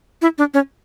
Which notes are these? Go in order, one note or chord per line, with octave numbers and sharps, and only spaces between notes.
E4
D4
C#4